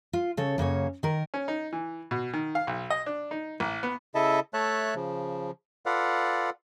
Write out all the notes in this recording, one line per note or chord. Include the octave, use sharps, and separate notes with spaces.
F4
C#3 A4 C#5
F#2 C#3 A#3 C#5
D#3 A#4
C#4
D#4
E3
B2
D#3
F5
B1
D#5
D4
D#4
A1
B3
C#3 E4 A4 D#5 E5 A5
A3 C#5 E5 A5 F#6
C#3 F3
F4 A4 B4 D5 F5 F#5